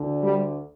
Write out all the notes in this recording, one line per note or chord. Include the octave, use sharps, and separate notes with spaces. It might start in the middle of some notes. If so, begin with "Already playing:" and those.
Already playing: D2 D3
G3